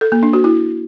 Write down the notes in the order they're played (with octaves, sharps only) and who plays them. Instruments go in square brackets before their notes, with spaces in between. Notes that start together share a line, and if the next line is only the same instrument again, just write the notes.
[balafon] A4
A#3
D4
F#4
E4